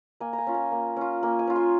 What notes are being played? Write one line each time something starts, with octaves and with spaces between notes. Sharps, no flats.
A#3 G#5
A#5
G#5
C#4 F4
G#5
A#3
C#4 F4
A#3 G#5
G#5
C#4 F4
C6